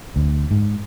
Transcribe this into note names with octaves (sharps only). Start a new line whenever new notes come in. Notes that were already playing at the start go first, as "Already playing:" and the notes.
D2
G#2